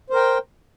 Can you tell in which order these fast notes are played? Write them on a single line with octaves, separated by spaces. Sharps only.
C5 A#4 G5